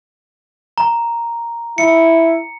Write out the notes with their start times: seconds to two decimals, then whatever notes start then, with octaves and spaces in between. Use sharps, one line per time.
0.78 A#5
1.78 E4 C#7